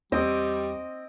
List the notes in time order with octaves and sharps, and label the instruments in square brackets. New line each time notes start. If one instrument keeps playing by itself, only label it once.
[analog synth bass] E2 [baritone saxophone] G3 [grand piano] C4 [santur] D#5 D6